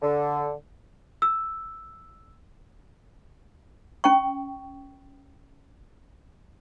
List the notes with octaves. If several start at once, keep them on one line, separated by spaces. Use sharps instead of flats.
D3
E6
C#4 G5 C#6